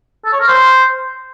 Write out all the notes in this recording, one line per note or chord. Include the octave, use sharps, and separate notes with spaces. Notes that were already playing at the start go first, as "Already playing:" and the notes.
A4
C#5
A#4
C5